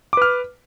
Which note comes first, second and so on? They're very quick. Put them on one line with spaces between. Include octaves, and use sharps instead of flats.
D6 B4 F6